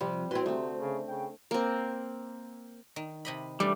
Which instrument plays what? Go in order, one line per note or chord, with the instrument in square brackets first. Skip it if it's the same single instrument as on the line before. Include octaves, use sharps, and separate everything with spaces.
[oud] C3 [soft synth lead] F3 [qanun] G3
[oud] E3 C4 [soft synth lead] F#4 [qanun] C6
[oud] D2 [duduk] C3 [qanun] A3 C4
[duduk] C#3
[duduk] C#3 [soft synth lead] G5
[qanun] A#3 C4
[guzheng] D#3
C3 D#5 B5
[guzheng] E3 A3 D4 [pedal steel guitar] G3